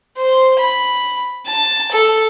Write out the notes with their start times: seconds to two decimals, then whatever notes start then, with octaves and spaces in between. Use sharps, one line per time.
0.17 C5
0.59 B5
1.46 A5
1.91 A4